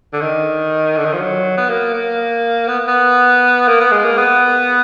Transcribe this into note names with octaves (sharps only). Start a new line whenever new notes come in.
D3
D#3
D3
D#3
F3
F#3
B3
A#3
A#3
B3
B3
A#3
B3
G#3
A#3
B3